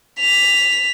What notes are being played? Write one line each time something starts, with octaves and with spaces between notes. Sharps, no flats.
B6 F7